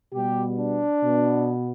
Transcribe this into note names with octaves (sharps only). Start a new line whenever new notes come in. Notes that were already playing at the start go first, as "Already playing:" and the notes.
B2 G3 B3 G4
D4
B2 B3